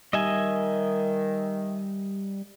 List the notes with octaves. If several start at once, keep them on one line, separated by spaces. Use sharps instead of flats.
D#3 G3 D#5 E5 G#5